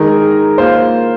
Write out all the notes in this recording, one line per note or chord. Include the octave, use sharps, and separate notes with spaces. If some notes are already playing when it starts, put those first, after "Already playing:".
Already playing: D#3 G#3 D#4 A#4
A#3 F4 C5